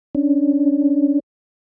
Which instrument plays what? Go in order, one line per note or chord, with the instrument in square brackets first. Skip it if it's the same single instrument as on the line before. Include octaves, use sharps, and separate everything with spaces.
[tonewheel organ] C#4 D4